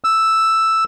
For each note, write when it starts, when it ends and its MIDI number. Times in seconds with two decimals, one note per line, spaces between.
0.04 0.84 88